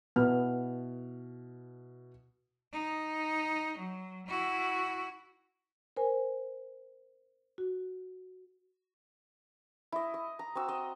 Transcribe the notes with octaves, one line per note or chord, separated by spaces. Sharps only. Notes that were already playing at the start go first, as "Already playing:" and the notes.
B2 B3 E4 F6
D#4
F#3
E4 F#4
A#4 C5 G#5
F#4
E4 D#5
D#5
A#5
C4 F#4 E6
D#5